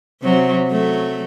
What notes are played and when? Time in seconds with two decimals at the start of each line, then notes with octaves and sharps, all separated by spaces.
0.22 C3 F#3
0.68 F#3 A3